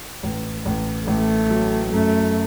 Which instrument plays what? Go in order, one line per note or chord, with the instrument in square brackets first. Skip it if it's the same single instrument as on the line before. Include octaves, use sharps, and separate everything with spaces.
[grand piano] A1
A1
[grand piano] A1 [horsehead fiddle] A3
[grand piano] F#3
[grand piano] F#2 [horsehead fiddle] A3